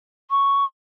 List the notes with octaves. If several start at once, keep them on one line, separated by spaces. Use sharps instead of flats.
C#6